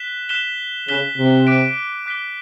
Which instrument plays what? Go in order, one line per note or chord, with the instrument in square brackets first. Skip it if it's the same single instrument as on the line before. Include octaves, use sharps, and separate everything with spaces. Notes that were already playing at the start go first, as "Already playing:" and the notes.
Already playing: [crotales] F#6 B6 E7 G7
F#6 B6 E7 G7
[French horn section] C#3 [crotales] F#6 B6 E7 G7
[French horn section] C3
[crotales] D6 F#6 B6 D7 G7
D6 F#6 B6 D7 G7